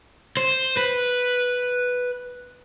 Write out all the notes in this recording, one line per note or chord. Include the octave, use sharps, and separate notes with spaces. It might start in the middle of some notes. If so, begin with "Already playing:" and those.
C5
B4